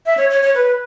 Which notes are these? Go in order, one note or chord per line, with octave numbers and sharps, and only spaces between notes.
E5
C#5
C#5
C#5
B4